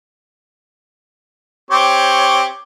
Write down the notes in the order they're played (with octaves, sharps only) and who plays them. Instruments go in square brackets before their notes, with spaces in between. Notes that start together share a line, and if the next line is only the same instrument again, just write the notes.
[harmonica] C4 G4 C#5